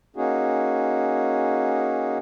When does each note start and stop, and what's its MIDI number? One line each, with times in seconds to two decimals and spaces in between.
0.17 2.18 58
0.17 2.18 61
0.17 2.18 63
0.17 2.18 66
0.17 2.18 68